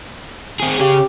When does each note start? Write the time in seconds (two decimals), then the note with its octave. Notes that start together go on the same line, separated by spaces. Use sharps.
0.60 C4 G#4
0.80 C#3 C#4 G4